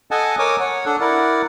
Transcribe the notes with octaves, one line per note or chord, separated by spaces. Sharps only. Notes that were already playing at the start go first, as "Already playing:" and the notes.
A4 D#5 F#5 G#5 A5
A#4 C#5 G#5 D6 D#6
C#5 F#5
D4 A4 F#5
E4 A#4 D5 F#5